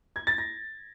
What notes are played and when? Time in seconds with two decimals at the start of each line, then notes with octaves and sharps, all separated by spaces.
0.16 G#6
0.27 A6
0.38 A#6